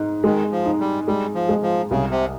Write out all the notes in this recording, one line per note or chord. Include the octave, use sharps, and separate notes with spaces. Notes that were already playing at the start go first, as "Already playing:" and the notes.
Already playing: G#2 D#4
D#3 G#3
F3
D#4
G3
G3 G#3
F3
G#3
F3
C2 C#3
C3